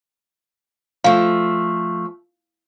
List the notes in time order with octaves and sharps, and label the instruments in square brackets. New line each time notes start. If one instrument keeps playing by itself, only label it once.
[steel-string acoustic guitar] F3 A3 [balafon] F5